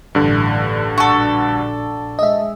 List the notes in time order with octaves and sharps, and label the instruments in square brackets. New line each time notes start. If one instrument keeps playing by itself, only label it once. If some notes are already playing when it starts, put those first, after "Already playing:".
[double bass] A1 E3 [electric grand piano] G2 D3
[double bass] A#1 D4 [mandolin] F#4 A4
[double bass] G#3 [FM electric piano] D#5 E5